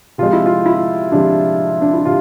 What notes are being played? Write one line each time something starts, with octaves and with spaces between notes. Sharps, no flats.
C3 F3 G#3 F4
E4
F4
E4
C3 F3 G#3 D4
D4
E4
C3 F4